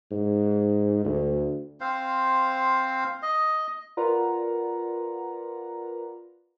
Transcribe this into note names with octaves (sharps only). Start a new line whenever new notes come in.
G#2
D2
C4 C5 F5
D#5
F4 A#4 B4 D5 F#5 A#5